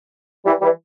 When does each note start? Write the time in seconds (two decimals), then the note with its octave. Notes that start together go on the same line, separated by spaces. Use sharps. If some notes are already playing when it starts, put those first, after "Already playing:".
0.45 E3 G3
0.61 E3 G3